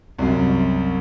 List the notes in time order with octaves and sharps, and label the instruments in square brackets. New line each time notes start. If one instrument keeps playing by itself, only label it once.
[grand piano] C2 F#2